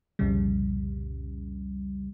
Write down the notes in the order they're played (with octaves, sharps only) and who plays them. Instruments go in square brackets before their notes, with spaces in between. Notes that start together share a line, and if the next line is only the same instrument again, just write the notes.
[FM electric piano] C2 F2 A#2 C#3 G3